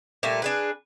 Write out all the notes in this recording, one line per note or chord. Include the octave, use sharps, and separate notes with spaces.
A#2 G3 A3
D4 G#4 B4